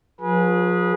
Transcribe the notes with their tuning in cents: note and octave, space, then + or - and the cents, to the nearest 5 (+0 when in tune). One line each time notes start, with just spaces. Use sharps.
F3 +40 G#4 +0 B4 -35